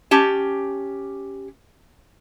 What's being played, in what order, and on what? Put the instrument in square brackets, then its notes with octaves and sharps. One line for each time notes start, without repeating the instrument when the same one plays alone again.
[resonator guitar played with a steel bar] C#4 G4 A5